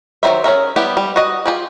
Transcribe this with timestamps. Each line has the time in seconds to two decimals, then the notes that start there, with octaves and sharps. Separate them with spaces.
0.23 D#3 F#3 D#4 C5 E5
0.44 C#4 G#4 A#4 E5
0.76 G3 B3 E4 G4
0.97 G3
1.16 F#4 D#5
1.46 F4 G4 G#4